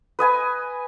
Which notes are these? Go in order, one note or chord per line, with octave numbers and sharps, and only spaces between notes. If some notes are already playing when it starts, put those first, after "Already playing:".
B4 D#5 G#5 B5